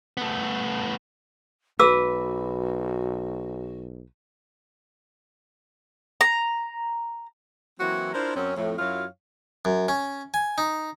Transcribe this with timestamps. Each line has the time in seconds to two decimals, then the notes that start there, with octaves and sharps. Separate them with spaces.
0.17 A3 B3
1.79 B1 F#4 B4 D6 E6
6.21 A#5
7.80 E3 F#3 A#3 C4 E4 F#4
8.13 D4 E4 F4 A#4 C5
8.35 F#2 C4 C#4
8.56 F2 A2
8.79 F#2 F#3 E4 F4 C#5 F5
9.65 F#2
9.88 C#4
10.34 G#5
10.58 D#4